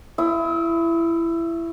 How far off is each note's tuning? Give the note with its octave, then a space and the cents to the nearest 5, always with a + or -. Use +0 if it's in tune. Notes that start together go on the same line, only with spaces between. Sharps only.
E4 +20 C#6 -5 E6 -45